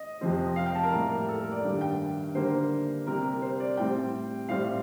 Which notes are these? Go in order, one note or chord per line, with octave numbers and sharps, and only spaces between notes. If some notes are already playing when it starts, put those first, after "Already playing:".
Already playing: D#5
F2 C3 F3 C4
F5
G5
A5
A#4
A2 G3 A#3
A4
A#4
D5
G2 D#3 G3
G5
D3 G3 A#3 C5
C3 G3 C4 A#4
C5
D5
A2 G3 C4 G5
A2 G3 C4 F5